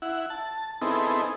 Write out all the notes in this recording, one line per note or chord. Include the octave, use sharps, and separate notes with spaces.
E4 F#5
A5
B3 C4 D#4 E4 G#4 A4